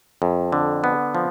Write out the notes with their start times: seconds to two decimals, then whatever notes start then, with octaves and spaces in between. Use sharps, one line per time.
0.22 F2
0.52 D3
0.84 B3
1.15 F3